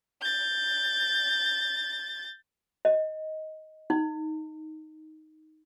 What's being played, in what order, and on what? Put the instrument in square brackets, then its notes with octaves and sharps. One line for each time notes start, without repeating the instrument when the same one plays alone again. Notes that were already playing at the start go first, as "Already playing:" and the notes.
[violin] G6 A6
[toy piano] D#5
D#4